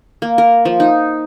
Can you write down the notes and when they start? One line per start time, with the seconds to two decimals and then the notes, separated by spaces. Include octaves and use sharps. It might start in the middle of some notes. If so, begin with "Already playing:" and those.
0.22 A#3
0.38 A#4
0.65 F3
0.80 D#4